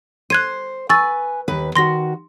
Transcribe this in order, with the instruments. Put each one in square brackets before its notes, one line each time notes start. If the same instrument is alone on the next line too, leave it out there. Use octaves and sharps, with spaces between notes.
[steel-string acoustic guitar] C5 [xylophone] F#6 G#6 D#7
[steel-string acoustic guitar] B4 G#5 [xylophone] C#6 E6 A6
[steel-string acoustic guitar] D#2 B4
[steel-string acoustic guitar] D#3 F#4 [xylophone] C6 A#6